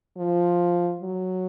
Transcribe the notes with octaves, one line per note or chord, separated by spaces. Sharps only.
F3
F#3